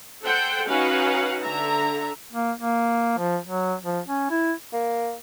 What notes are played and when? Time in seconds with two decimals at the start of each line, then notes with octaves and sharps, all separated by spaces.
0.24 A4 C5 F#5 G5
0.66 C#4 D#4 F#4 B4 F5 F#5
1.43 D3 E5 A#5
2.33 A#3
2.58 A#3
3.18 F3
3.45 F#3
3.83 F3
4.08 C#4
4.30 E4
4.73 A#3